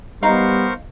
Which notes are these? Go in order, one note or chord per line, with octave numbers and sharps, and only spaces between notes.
G3 B3 D#4 A#4 C5 F5 C#6